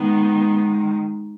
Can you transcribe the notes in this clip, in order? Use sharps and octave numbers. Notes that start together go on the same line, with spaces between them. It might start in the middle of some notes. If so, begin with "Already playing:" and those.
Already playing: D#3 G#3 B3